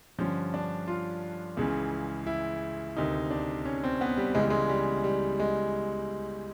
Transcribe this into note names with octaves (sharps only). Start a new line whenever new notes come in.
G2 D3 F3 C#4
D4
F4
C#2 C#3 E3
E4
D2 C3 D#3 D#4
D4
C#4
C4
B3
G3
C#2 C#3 E3 G#3
G3
G#3
G3
G3
G#3